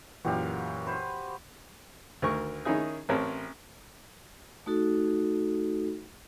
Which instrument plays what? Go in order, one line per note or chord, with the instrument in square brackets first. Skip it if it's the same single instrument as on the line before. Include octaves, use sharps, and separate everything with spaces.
[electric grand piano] F#2 A#2 E3 [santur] F#4 G4 F5
[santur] B4 C5
[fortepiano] D2 D#3 A#4 C#6
D#3 C#4 D#4 E4 G#4
A1 C4 A#4 C#5 A5
[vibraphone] A3 D#4 F#4 A4